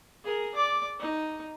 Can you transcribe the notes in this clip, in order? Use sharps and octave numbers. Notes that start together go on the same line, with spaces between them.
G#4 A#4
D5 D6
D#4